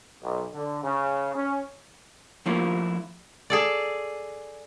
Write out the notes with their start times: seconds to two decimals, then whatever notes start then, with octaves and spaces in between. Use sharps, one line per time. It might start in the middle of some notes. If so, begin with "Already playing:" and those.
0.23 B1
0.54 D3
0.84 C#3
1.35 C#4
2.46 F3 A3 A#3 E4 F4
3.50 G#4 A4 D5